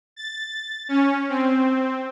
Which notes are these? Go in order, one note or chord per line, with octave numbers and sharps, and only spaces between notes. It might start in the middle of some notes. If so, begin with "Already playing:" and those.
A6
C#4
C4